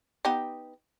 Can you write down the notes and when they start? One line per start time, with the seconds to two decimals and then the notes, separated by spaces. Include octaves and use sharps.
0.25 B3 D#4 G4